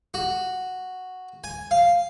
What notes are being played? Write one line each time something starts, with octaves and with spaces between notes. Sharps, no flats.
F#4
G#5
F5